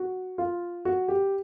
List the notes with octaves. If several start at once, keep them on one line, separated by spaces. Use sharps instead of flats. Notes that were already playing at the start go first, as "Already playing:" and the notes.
Already playing: F#4
F4
F#4
G4